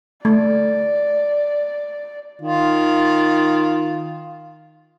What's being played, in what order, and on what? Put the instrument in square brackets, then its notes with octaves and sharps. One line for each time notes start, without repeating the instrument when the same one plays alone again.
[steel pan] A3 [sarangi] D5
[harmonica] D#3 F4